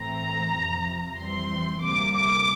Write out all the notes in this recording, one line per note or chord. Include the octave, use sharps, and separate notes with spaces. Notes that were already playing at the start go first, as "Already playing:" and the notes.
Already playing: A2 E3 A3 C4 A#5
F2 C3 F3
F2 E3 G3 C4 C6
D2 C3 G3 A#3 D6
D6